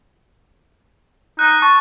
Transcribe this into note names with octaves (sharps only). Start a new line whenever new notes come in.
D#4 F#6
A5 C#6